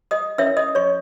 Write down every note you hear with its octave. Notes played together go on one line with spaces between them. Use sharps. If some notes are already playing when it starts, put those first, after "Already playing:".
D#5 D#6
C#4 E4 A#4 C#5 E5 E6
D#5 D#6
C#5 C#6